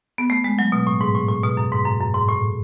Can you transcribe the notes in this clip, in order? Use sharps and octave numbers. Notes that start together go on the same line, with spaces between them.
B3
A3
G#3
F#3
B2
A2
G#2
A2
A2
B2
F#2
G#2
F#2
F#2
G#2
A2